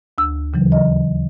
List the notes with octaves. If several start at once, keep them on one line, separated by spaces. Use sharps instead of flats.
D2 E6
D#2 C#3 E3 F#3
D#5